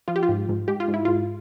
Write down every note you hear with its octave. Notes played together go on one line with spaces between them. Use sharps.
F3 F4
G4
F4
G#2
G#2
G#3 G4
F4
G#2
E4
G#2 F4